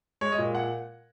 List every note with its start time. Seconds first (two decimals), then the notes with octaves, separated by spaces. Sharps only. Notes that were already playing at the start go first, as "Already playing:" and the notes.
0.21 G#3 C#5
0.32 D#5
0.38 A#2
0.55 F#5